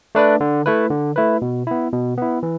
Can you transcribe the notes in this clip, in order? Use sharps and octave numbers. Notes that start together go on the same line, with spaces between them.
A3 D4 B4 D5
D3
A3 E4 B4
D3
A3 E4 B4
B2
B3 E4
B2
B3 E4
E3